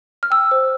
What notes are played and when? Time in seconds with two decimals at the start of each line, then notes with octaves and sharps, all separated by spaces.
0.23 F6
0.30 G5 E6
0.51 C5